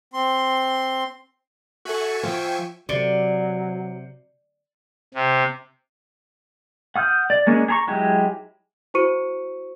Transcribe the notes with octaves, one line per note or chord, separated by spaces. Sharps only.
C4 C6
F#4 A4 E5 G#5 C#6
F3 G5
C3 F#3 D5
C3
F#5 D#6 F6 G6
D5
G#3 A#3 C#4 D4
G#4 A#5 C#6
F#3 G#3 E4 G4
E4 F#4 C5 C#6 C#7 D#7